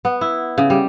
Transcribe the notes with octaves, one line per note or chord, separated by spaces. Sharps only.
B3
E4
C#3
G3